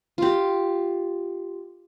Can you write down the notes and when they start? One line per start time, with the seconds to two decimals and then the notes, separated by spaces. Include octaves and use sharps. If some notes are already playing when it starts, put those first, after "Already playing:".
0.18 F4 G4